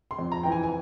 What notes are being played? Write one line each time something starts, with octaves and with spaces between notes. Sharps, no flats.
C6
F2
A#5
E3 G5
G#5
G#5